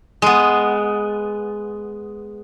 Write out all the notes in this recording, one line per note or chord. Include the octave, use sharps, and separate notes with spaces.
G#3 B3